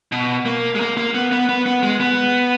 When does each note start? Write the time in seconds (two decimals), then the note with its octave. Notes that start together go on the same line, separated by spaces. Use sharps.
0.12 B2
0.46 A#3
0.75 G#3
0.80 A#3
0.97 A#3
1.14 B3
1.32 B3
1.49 B3
1.66 B3
1.83 G#3
2.00 B3